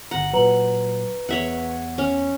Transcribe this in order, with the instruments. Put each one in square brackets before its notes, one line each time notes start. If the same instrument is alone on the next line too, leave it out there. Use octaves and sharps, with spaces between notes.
[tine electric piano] G1 A#5 [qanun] F#5
[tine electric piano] A#2 F#3 [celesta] B4 A#5 F#7
[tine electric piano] E2 [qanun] C#5 E5 F#5
[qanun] C#4